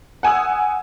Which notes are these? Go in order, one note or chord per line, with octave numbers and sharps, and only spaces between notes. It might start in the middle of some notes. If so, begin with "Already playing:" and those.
F#5 G#5 D#6 E6